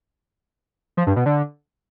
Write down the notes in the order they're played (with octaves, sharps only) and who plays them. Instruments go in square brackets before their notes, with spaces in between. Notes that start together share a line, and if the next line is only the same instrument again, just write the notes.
[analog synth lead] F3
G2
B2
D3